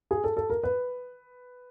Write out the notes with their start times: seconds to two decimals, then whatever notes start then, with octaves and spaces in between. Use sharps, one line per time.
0.11 G#4
0.24 A4
0.37 A4
0.50 A#4
0.63 B4